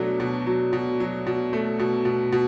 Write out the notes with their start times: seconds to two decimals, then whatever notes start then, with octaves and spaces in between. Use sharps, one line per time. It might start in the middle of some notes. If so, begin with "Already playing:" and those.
Already playing: B2 F#3 A3 D4
0.20 B2
0.46 F#3
0.73 B2
1.00 F#3
1.27 B2
1.53 A3
1.79 B2
2.05 B2
2.32 B2